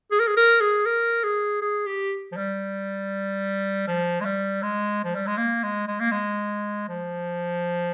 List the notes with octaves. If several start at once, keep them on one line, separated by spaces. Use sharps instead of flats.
G#4
A#4
G#4
A#4
G#4
A#4
G#4
G#4
G4
F3
G3
F3
G#3
G3
G#3
F3
G3
G#3
A#3
G#3
G#3
A#3
G#3
F3